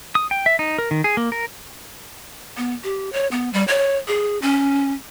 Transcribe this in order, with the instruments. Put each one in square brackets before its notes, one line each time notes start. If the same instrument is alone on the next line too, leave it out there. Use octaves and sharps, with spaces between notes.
[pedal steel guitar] D#6
G5
E5
D#4
A#4
D#3
G#4
A#3
A#4
[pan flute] B3
G4
C#5
B3
G3
C#5
G#4
C#4